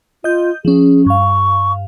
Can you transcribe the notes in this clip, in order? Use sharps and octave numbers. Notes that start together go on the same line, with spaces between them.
F4 D#5 G6
F3 C#4 G#4
G2 F5 C#6